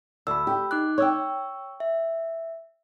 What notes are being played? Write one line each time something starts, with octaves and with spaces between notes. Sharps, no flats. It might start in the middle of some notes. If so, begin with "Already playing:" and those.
D2 B5 E6
G4
D#4 D6 F#6
C#5 G5 C#6 E6
E5